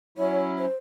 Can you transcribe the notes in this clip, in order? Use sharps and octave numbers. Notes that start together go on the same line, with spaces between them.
F#3 C#4 E4 C#5
C5